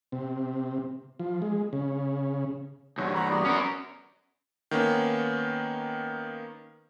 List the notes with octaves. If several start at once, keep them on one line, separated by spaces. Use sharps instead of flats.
C3
F3
G#3
C#3
C2 G2 F#4 C#5
F#5 A#5 B5
B3 F#4 D5
C#4 A#4
D#3 A#3 B3 C#4